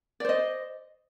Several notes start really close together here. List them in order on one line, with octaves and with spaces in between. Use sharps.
D5 C5 D#5